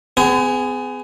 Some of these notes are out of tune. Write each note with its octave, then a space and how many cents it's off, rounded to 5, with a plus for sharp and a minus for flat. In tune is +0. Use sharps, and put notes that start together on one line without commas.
B3 +45 G#4 +0